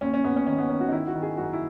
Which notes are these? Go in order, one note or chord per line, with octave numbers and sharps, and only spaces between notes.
D#2 C#4
C#4
D#2 B3
C#4
D#3 C#4
B3
D#3 C#4
F#4
D#4
D#3 E4
F#4
D#3
G#4
F#2 F#4
E4